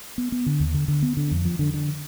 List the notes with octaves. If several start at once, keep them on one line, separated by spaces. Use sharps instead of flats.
B3
B3
D3
D#2
D3
D3
B3
D3
F2
F3
D3
D3